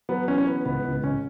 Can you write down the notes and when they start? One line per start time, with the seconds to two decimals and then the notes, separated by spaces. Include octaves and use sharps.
0.09 F#3 B3
0.28 E3 C#4
0.38 C#4
0.46 E3 B3
0.65 C#2 B3
0.85 C#2
1.04 C#2 C#4